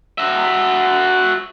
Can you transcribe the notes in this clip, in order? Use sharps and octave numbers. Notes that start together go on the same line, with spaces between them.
F#4 E5